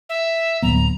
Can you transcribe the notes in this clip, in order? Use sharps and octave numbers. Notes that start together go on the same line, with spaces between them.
E5
D1 F#3 B3 A#5